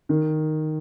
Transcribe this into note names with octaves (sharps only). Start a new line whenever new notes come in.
D#3